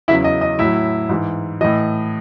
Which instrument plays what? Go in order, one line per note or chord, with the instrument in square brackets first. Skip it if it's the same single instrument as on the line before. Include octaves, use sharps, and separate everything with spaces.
[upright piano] E2 C#3 F#3 E4 E5
D#5
D#5
A2 F#3 E4 E5
G#2 E3
A2 E3 D#5